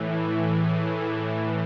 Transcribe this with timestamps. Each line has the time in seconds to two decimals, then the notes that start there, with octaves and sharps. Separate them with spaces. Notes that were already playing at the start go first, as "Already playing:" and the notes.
Already playing: A2 E3
0.54 G#4 G#5
0.96 E4 E5